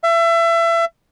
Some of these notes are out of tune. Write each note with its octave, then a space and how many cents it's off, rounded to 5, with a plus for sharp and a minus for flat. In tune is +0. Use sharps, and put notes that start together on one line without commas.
E5 +30